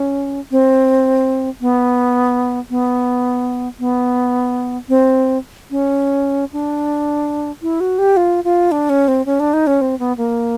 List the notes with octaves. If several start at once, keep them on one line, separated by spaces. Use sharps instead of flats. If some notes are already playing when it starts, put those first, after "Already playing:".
Already playing: C#4
C4
B3
B3
B3
C4
C#4
D4
E4
F#4
G4
F4
F4
D4
C#4
C4
C#4
D4
D#4
C#4
C4
B3
A#3